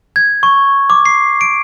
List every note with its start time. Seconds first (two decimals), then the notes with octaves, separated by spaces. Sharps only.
0.16 G#6
0.43 C#6
0.90 D6
1.06 C7
1.41 D7